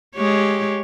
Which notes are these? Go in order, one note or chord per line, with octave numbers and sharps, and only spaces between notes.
G#3 G4 C#5